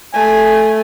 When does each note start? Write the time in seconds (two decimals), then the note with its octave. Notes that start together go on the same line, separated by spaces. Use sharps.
0.13 A3 G#5